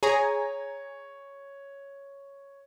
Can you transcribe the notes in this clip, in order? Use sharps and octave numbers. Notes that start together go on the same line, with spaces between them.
G#4 C#5 G#5 A#5